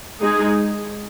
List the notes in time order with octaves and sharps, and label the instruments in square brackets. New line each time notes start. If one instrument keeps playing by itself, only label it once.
[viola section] G#3 D#4 G#4